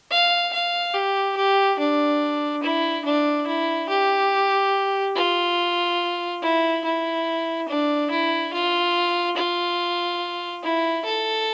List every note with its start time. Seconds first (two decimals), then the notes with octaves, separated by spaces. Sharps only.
0.11 F5
0.53 F5
0.94 G4
1.37 G4
1.79 D4
2.63 E4
3.05 D4
3.47 E4
3.89 G4
5.16 F4
6.42 E4
6.85 E4
7.69 D4
8.11 E4
8.53 F4
9.37 F4
10.63 E4
11.05 A4